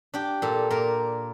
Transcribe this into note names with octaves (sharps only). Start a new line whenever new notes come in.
D4 G4
A#2 A4
A#2 A#4